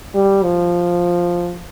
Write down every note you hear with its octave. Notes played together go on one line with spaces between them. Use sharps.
G3
F3